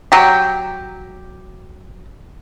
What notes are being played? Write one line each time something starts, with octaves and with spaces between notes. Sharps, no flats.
F#3 G4